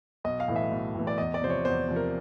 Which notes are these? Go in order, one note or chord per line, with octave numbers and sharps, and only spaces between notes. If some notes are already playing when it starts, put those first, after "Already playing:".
B1 D#5
F5
A2 E3 A3
E5
B1
A2 E3 A3
D5
E2 D#5
D5
C3 F3 C5
C#5
E2 C5
C3 F3
A#4